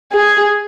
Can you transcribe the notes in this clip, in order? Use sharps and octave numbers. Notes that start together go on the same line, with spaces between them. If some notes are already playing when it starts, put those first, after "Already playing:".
G#4